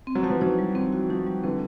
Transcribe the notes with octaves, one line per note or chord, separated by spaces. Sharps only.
C4
F#3
F3 F#4
E3 F#3
E3 F#3 D#4
G3
D#3 F3 C4
F#4
D#3 F3 D#4
G3
D3 E3 C4